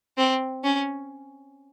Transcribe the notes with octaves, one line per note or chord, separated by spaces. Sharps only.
C4
C#4